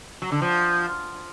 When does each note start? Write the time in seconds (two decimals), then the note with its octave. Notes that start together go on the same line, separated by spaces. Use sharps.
0.22 F#3
0.32 D3
0.42 F3